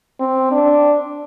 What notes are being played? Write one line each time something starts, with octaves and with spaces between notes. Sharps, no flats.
C4
D4